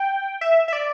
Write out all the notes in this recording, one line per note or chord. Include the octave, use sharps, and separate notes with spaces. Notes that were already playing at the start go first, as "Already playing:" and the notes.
Already playing: G5
E5
E5
D5